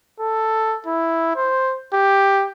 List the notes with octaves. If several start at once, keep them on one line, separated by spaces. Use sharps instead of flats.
A4
E4
C5
G4